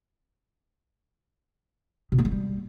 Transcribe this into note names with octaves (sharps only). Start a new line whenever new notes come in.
B2
A#3
G#3
G3